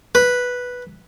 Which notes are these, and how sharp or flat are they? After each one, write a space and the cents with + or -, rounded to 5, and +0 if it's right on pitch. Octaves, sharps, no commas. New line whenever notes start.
B4 -5